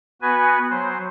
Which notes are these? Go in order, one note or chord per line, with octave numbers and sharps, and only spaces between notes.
B3 F#4 B4 G#5
F#3 C5